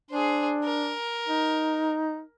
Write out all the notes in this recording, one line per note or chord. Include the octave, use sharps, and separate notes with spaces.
D4 G#4 C5
A#4
D#4